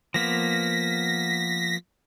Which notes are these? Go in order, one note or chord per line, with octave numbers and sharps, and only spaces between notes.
F3 A#3 B3 A#6 B6